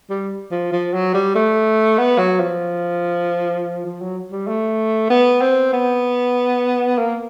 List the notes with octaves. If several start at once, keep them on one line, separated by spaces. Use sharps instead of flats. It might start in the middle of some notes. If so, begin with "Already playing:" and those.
G3
F3
F3
F#3
G3
A3
B3
F#3
F3
F3
F#3
G3
A3
B3
C4
B3
A#3